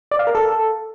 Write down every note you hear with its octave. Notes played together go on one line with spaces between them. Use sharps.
D5
F5
A#4
A4